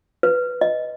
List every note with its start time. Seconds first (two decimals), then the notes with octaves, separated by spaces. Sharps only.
0.23 B4
0.61 D#5